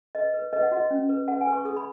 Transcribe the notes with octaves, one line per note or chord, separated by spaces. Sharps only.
B4 D#5
B4
B4 D#5
F#5
F#4 D#5
C#4
B4
B4 F#5
G#5
B4
C#6
G#4 D#6
B5